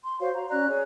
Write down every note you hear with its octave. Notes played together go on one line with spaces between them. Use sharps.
C6
F#4 C5 C#5 F5
A#5
C#4 D5 A#5 F#6
G#4 C#5